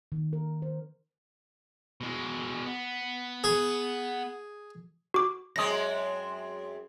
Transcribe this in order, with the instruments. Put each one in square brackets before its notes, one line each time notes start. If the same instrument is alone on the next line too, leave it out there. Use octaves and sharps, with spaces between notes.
[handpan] D#3
A#4
C5
[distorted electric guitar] B2 G#3
B3
[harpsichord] G#4
[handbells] F#4 D6
[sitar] F#2 G#3 C4 [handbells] D#6 A#6